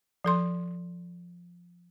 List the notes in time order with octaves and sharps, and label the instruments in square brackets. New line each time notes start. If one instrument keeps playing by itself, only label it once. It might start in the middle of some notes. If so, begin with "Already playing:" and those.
[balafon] F3 A4 C6